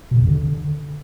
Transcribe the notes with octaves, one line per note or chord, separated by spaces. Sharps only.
B2
C3
E2
D3